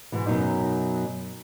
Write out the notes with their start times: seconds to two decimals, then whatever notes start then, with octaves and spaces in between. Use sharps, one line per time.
0.12 G#2 B2 E3
0.27 F#2 B2 F#3 D#4